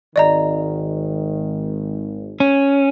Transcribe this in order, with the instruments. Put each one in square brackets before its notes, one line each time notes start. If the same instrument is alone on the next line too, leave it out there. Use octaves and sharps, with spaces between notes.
[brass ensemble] G#1 D#3 [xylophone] D5 D#5 A#5
[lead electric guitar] C#4